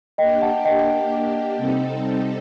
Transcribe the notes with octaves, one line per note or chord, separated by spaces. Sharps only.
A#3 D4 G4 D#5 G5
F#5 A5
D#5 G5
C3 G3 C4 D#4 A4